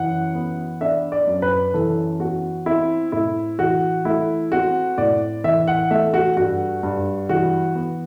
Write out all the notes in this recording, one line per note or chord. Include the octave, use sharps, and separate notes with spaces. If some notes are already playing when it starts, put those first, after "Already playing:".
Already playing: F#2 E3 F#5
B3
D4 E5
D5
F#2
B4
E3 A4
B3 F#4
C4 E4
A2 E4
E3 F#4
A3 E4
C4 F#4
A2 D5
E3 E5
F#5
A3 E5
F#4
G2 F#4
G2
E3 F#4
B3